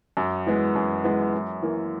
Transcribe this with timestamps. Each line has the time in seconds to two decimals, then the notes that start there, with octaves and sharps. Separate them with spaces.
0.17 F#2
0.46 E3 G#3 B3
0.76 F#2
1.04 E3 G#3 B3
1.34 F#2
1.62 E3 A#3